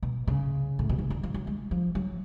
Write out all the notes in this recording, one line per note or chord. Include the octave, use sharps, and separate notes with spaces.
B2
C#3
A2
B2
C#3
D3
F3
F#3
G#3
F3
F#3